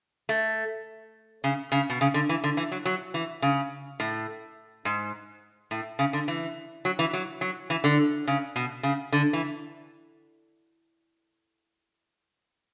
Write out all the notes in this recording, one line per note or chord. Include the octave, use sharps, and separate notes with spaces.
A3
C#3
C#3
B2
C#3
D3
E3
D3
E3
F#3
F#3
E3
C#3
A2
G#2
A2
C#3
D3
E3
F#3
E3
F#3
F#3
E3
D3
C#3
B2
C#3
D3
E3